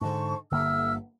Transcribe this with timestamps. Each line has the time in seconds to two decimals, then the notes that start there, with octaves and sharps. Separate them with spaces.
0.01 G#2 D3 C5 A5 C#6
0.51 G1 D3 A#3 E5 E6 F6